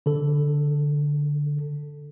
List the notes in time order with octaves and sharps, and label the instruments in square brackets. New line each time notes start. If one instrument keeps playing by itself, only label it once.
[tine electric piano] D3 A4